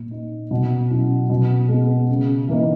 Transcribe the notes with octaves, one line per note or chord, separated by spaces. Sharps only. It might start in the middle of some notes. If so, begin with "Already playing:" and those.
Already playing: A#2
A#3 D#4
B2
F#3 C#4 E4
B2
G#3 B3
C#3
E3 A#3 D#4